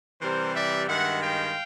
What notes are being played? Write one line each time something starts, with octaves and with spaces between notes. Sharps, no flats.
C3 E3 G3 A#4 C5
D5 E5
G2 D#3 G#3 E5 F#5
F5 G5